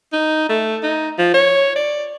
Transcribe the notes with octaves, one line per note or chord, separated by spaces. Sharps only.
D#4
A3
D#4
F3
C#5
D5